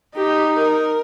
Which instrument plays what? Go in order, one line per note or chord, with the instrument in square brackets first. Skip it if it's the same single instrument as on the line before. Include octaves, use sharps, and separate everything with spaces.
[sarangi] D#4 [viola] G4
[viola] A#4